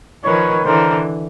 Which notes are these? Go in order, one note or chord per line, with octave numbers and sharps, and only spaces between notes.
D#3 F3 B4 C#5
D3 E3 A#4 C5